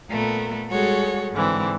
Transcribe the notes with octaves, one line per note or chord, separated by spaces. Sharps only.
A#2 A3 B3 A4 A#4
G3 G#3 F#4 G#4 A4 C#5
G#2 D3 E3 C4